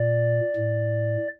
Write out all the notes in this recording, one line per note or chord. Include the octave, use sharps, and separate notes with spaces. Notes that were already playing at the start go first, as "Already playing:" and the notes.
Already playing: A#2 D5
A2